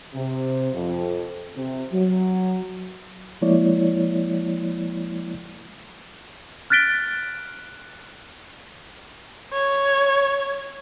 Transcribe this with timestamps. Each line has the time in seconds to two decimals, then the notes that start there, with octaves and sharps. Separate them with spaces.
0.15 C3
0.74 F2
1.57 C3
1.93 F#3
3.42 F3 G#3 A#3 E4 C#5 D5
6.70 F6 F#6 A6 B6 D7 G7
9.53 C#5